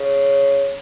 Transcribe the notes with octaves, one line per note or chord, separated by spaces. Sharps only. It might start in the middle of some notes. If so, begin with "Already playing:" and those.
Already playing: C#3